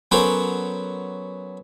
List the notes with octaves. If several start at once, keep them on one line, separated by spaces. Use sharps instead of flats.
F#3 B3 C#4 A4 A#4 C5